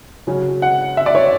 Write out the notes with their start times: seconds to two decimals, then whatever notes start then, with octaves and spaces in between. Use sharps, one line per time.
0.27 C#3 F#3 C#4
0.62 F#5
0.97 E5
1.06 D5
1.15 C#5